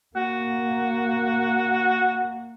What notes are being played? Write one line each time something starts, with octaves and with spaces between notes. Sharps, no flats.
A#3 F#4